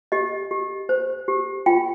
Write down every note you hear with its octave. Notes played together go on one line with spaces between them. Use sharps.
G4 D#5
G4
C5
G4
F4 G5